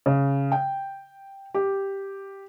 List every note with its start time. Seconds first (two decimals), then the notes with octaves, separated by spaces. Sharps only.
0.06 C#3
0.52 G5
1.54 G4